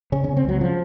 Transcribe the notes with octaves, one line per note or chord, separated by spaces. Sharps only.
C#3 C#4
C#3 C#4
C4
C#2 F#3
C#3 F3